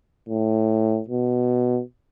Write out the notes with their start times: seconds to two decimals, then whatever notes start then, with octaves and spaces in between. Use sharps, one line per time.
0.29 A2
1.08 B2